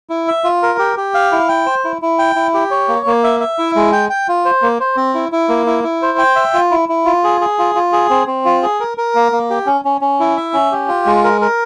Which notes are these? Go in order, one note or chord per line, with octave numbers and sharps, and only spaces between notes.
E4
E5
F4
A#4
G4
G4
F5
E4
G5
C5
E4
E4
G5
E4
G4
C#5
A#3
A#3
E5
E5
E4
G#3
G5
G5
F4
C5
A#3
C5
C4
E4
E4
A#3
E4
E4
C5
G5
E5
F4
E4
E4
F4
G#4
G#4
F4
F4
G#4
C4
C4
F4
G#4
A#4
A#4
A#3
A#3
G4
C#4
C#4
C#4
E4
E5
C#4
G4
F4
G#3
A#4
A#4